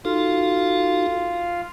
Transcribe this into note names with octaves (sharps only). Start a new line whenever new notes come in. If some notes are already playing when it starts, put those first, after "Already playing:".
D#4 F4 F#4 A4 F5